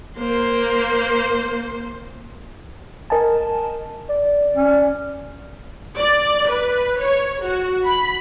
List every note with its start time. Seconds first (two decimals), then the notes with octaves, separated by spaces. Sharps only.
0.18 A#3 C5
3.10 A#4 D#5 G#5 A5
4.09 D5
4.55 C#4
5.98 D5
6.50 B4
7.00 C#5
7.42 F#4
7.87 B5